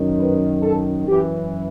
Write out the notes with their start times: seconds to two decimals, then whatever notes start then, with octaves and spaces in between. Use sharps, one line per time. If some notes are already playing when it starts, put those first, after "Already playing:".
Already playing: F#2 D#3
0.18 B4
0.62 A4
1.07 F#2 E3 G4